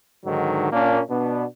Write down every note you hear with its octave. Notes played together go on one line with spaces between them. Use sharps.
G#2 D3 D#3 F#3
A#2 A#3 C#4 D4
B2 B3 D4